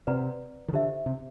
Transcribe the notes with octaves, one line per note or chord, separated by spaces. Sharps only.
C3 B4 D5 F#5 A#5
D#3
D3 D#4 G4 C5 E5
C3